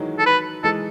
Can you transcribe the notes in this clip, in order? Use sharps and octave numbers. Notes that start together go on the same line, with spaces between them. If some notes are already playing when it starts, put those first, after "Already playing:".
Already playing: D#3 E3 F#3 G#3
A4
B4
E3 G#3 A4